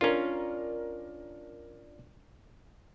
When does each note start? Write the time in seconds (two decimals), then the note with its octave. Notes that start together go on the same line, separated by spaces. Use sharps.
0.01 C#4 D4 F4 A#4